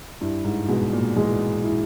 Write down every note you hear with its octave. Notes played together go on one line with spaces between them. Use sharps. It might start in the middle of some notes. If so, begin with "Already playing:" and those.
G2 E4
G#2
B2 G#3
A#2
E3 G#3
E4